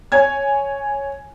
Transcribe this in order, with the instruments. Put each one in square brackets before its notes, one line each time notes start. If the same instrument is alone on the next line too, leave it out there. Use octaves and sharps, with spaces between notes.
[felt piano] C#5 G#5 G#6